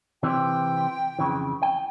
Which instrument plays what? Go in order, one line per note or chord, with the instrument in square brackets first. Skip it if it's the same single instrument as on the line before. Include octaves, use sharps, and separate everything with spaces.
[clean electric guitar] C3 E3 C4 [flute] G5
[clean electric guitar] F2 C#3 E3
G5